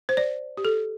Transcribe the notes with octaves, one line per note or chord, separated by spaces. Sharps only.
C5
D5
G4
A4